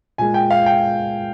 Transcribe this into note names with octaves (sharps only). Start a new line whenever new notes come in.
A#2 G#3 G#5
G5
F5
G5